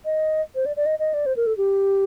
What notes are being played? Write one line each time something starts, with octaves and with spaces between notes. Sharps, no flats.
D#5
C5
D5
D5
D#5
D#5
D5
C5
A#4
A4
G4